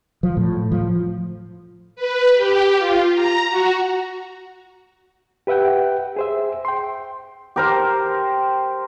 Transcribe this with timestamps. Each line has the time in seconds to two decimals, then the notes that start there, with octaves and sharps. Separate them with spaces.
0.23 F3
0.37 A2
0.72 F3
1.96 B4
2.34 G4
2.78 F4
3.14 A#5
3.49 F#4
5.47 G4 B4 E5 F#5 G5
6.16 G#4 C5 E5
6.65 G5 C6
7.56 G4 A#4 C5